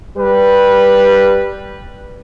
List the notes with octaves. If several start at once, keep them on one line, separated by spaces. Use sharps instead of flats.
G3 B4